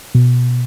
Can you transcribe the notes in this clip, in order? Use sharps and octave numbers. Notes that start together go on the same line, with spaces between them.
B2